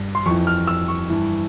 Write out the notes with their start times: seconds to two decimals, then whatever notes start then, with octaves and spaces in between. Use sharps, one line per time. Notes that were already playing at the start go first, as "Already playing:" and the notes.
Already playing: G2
0.15 C6
0.26 F2 E3 C#6
0.47 F6
0.67 E6
0.88 C#6
1.09 G2 E3